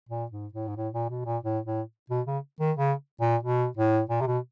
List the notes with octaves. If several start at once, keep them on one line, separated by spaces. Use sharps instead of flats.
A#2
G#2
A2
G#2
A2
A#2
B2
A#2
A2
A2
B2
C#3
D#3
C#3
A#2
B2
A2
A#2
C3
B2